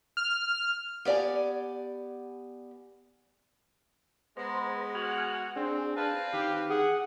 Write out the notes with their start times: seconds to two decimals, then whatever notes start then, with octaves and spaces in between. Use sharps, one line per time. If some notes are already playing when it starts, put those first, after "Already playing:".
0.17 F6
1.05 B3 G4 D5 F#5 G#5
4.37 G#3 B3 B4 C5 A#5
4.95 F#4 G#5 F6 F#6
5.56 C4 D4 G#4
5.96 C4 B4 F5 A5
6.33 D#3 G4
6.70 G#4 F#5